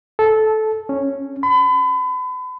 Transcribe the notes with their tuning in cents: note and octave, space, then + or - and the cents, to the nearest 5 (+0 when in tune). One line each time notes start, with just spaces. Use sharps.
A4 -15
C#4 -5
B5 +35